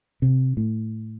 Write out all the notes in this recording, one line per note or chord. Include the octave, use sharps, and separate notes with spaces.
C3
A2